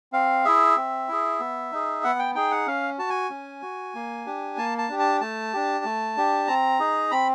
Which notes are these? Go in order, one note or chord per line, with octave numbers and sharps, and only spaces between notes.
C4 F5
E4 G#4 E5
C4
E4 G#4
B3
D#4 G#4
B3 F#5
G5
D#4 G#4 G5
F#5
C#4 F5
F#4 A5
G#5
C#4
F#4
A#3
D4 G4
A#3 A5
A5
D4 G4
A5
A3 A5
D4 G4
A3
D4 G4
C4 A#5
D#4 G#4
C4 B5